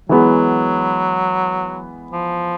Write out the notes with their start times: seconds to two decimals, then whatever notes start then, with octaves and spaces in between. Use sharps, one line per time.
0.09 E3 F#3 G#3 B3
2.12 F3